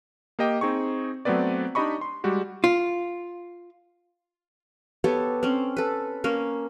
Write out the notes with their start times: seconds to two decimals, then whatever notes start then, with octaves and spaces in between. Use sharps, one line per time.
0.39 A#3 G4 D#5 G5
0.61 C4 D#4 G#4 C#6
1.25 F#3 A3 B3 C4 B4 D5
1.75 D4 D#4 G4 D#5 B5 C#6
2.01 C6
2.24 G3 G#3 F#4 G4
2.64 F4
5.04 B3 G4 A4 C#5
5.43 C4 C#4
5.77 A4 B4
6.24 A#3 C#4